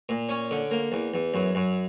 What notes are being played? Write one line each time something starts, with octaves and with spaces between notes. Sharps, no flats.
A#2
C#4
D3
A#3
E2
E2
F#2
F#2